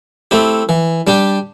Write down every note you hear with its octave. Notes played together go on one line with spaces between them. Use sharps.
A3 C4 E4 G4
E3
G3 D4 G4